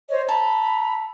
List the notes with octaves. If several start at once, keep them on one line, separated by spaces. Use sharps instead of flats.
C5 C#5 D#5
A4 A#5 B5